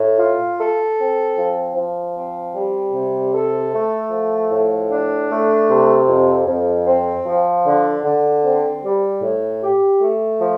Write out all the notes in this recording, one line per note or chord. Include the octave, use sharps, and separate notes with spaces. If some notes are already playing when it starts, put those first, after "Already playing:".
Already playing: A2
F4
A4
C4
F3
F3
C4
G3
C3
A4
A3
F3
A2
D4
A3
C3
F2
F2
C4
F3
D3
D3
C4
G3
A2
G4
A3
F3